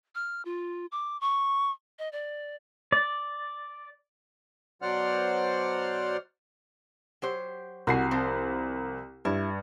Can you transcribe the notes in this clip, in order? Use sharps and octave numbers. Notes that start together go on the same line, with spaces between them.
F6
F4
D6
C#6
D#5
D5
D5
B2 F#3 C5 D5 F#5 F6
F#3 G4 C5
C2 F#4 F#5 G#5 C7
F3 C4 C5
G2 E4